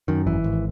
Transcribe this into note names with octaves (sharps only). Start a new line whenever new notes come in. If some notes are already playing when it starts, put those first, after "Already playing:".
F#2 D#3
G#1 E3
G#1